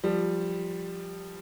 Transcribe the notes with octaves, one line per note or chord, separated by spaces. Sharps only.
F3 G3